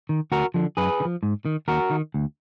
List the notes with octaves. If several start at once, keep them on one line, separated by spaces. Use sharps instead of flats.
D#3
D2 F#4 A#4
D3 F3
F#2 G#4 B4
D3
F3
G#2
D#3
D#2 F#4 A#4
D#3
D2